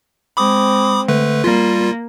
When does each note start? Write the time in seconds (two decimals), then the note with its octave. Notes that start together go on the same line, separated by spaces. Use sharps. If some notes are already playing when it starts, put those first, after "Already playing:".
0.37 G#3 C4 B5 D6 D#6
1.08 D3 A3 B4
1.44 G3 A#3 F4